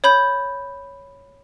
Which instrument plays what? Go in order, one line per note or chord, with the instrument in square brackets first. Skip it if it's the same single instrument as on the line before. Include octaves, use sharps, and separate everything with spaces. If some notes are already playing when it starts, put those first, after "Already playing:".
[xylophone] C#5 B5 G6